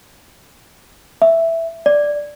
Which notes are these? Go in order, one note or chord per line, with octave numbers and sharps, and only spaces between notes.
E5
D5